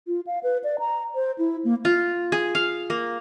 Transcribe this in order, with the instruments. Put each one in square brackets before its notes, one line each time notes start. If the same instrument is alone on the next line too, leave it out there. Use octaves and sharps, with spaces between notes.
[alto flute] F4
F5
B4
D5
A#5
C5
E4
A#3
[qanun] F4
G#4
F5
A#3